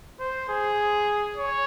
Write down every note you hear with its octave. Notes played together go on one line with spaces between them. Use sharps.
C5
G#4
C#5